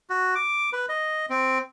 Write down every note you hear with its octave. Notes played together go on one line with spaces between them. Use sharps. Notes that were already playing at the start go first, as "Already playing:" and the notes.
F#4
D6
B4
D#5
C4